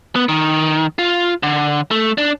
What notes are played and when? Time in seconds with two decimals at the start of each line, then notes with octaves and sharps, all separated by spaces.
0.16 B3
0.29 D#3
0.99 F4
1.43 D3
1.91 A3
2.18 D4